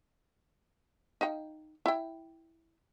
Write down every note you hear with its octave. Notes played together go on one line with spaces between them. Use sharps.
D#4 F5 G5
E4 G5